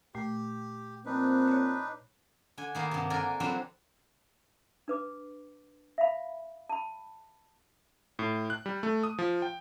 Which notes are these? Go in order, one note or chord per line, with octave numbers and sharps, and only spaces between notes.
A#2 A3 G4
F3 A#3 C4 D4 D#4 B4
C#5 B5
D3 G#5
D#3 A#3 B3
G2 C3
D3 A#4 D5 G#5
D3 F3 F#3 C4 B4
D4 B4 D6
E5 F5 B5
A5 B5
A2
F#6
G3
A3
D#6
F3
G5